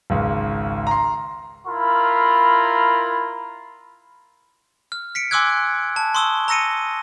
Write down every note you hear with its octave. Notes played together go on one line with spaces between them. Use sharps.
G#1 C#2
A#5 C6
E4 F4 A#4 B5
F6
B6 C#7 D7
G#5 C6 D6 E6 F#6 G#6
A5
C6 C#6 D#6 E6 G7
A#5 E6 A#6 C#7 D#7